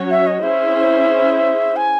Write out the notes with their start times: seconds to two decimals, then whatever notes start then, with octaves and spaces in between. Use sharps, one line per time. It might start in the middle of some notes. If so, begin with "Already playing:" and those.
Already playing: F#3 C#4 F#4 C#5
0.11 E5
0.27 D#5
0.43 C#4 E4 G#4 C5 E5
1.76 G#5